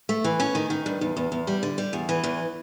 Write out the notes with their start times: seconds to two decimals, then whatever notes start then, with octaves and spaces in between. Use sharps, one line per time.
0.09 A3
0.24 E3
0.40 C#4
0.55 D#3
0.70 D#3
0.86 G2
1.01 E2
1.17 E2
1.32 E2
1.47 G3
1.63 D3
1.78 G3
1.93 E2
2.09 E3
2.24 E2